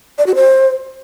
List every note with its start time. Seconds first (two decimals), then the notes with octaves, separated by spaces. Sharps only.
0.18 D5
0.27 F#4
0.35 C5